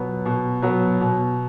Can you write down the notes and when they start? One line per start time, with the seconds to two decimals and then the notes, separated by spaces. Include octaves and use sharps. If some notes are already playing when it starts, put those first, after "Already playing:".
Already playing: B2 F#3 B3
0.26 B2
0.62 F#3 B3
1.01 B2